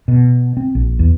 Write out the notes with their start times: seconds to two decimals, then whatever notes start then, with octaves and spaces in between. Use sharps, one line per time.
0.08 B2
0.57 C4
0.75 A#1
0.99 E2